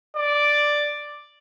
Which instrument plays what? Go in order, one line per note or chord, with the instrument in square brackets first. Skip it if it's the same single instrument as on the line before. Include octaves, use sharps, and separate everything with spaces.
[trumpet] D5